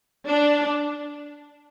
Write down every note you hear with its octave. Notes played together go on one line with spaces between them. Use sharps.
D4